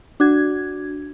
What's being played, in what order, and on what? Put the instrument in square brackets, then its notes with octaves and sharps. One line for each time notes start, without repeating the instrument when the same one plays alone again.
[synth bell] D4 F#4 G#6